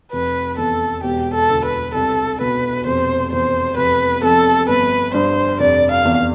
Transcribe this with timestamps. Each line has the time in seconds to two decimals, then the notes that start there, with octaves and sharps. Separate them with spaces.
0.13 F1 B4
0.58 E2 A4
1.03 E1 G4
1.34 A4
1.50 D2
1.65 B4
1.95 C2 A4
2.41 B2 B4
2.86 F1 C5
3.32 E2 C5
3.77 F1 B4
4.23 F2 A4
4.68 G1 B4
5.14 G2 C5
5.60 F1 D5
5.91 F5
6.05 E2